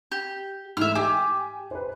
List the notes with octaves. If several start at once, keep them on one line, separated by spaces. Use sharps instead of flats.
G4
G#2 E3 A3 E5 F6
G4 G5 G#5
B4 C5